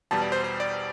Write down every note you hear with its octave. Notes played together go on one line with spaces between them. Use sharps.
E2 B2 G3 A5
D5
C5
C5
D5